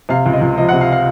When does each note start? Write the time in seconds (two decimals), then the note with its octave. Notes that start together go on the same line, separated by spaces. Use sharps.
0.09 C3 F5
0.26 C#2
0.33 D#5
0.41 C#2
0.58 F3 D#5
0.69 F#5
0.72 C3
0.81 F5
0.92 F5